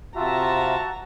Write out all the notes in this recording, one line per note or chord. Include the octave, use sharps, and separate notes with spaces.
C3 F4 F#4 E5 A5 A#5